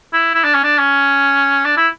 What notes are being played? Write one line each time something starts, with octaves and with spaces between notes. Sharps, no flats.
E4
E4
D4
C#4
D4
C#4
D4
E4